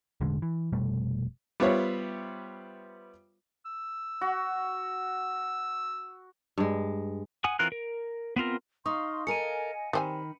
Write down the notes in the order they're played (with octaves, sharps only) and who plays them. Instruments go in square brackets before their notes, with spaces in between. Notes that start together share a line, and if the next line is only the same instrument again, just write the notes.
[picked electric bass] E1 A1 D3 G#3
E3
F1 B2 G3 A3
[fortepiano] G3 B3 F4 C5 C#5 E5
[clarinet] E6
[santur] F#4
[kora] G2 G#3
[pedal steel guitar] F#5 G#5 D#6
E3 C4 F4 A#4 F#6
A#4
B3 C4 F4 A#4
[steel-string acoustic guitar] D#4 [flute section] F5 C6 [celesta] C#6 D#6
[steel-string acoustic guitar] A4 A#4 [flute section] D#5 F5 G#5 [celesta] C#7 D#7
[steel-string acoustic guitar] D#3 [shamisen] G3 C4 G#5 [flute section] B5